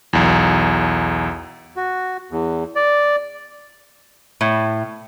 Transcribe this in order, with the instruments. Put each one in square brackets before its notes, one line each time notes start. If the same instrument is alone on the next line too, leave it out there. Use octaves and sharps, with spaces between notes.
[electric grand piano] B1 E2
[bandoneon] F#4
E2
D5
[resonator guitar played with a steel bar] A2